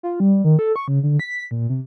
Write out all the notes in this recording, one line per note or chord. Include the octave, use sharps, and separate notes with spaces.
F4
G3
D#3
A4
C#6
C#3
D3
B6
A#2
C3